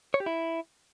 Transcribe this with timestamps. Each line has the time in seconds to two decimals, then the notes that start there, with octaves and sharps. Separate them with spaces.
0.14 C#5
0.20 G4
0.26 E4